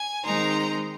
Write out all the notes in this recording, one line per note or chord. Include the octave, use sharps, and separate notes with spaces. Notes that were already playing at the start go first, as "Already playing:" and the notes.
Already playing: G#5
D#3 G#3 C4 D#4 A#5 C6